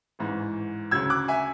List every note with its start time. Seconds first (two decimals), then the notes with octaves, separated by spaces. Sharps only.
0.19 A1 G#2 E3
0.91 D2 C#3 F#3 E6 G#6
1.10 D6 F#6
1.28 E5 G#5